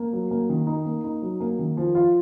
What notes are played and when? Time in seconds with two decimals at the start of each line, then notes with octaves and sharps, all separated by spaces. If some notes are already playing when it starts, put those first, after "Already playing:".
Already playing: A#3
0.13 F#3
0.31 A#3
0.49 D#3
0.67 D#4
0.85 A#3
1.04 D#4
1.22 F#3
1.40 A#3
1.59 D#3
1.77 F3
1.95 F4